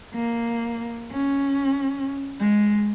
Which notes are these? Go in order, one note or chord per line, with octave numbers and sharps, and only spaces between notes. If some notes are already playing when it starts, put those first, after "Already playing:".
A#3
C#4
G#3